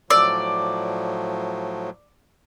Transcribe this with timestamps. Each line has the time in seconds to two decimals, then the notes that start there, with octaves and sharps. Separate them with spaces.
0.10 A2 F3 F#3 D5 E6